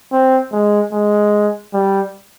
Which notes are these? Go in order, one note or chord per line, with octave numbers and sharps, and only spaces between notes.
C4
G#3
G#3
G3